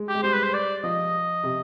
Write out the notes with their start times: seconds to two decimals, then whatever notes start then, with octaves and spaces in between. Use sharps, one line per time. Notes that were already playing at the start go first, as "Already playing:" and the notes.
Already playing: G#3
0.08 G4
0.15 G#3
0.23 G3 C5
0.34 B4
0.43 C5
0.54 D5
0.84 F3 D#5
1.43 C3